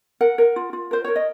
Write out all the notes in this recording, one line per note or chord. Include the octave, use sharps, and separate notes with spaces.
A#4 F#5
A#4
F4
F4
A#4 C5
A#4 C#5
D#5